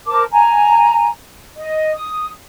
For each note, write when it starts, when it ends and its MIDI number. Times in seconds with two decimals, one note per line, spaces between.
0.06 0.22 70
0.06 0.22 72
0.06 0.22 81
0.06 0.22 86
0.30 1.06 80
0.30 1.06 82
1.56 1.89 75
1.94 2.27 87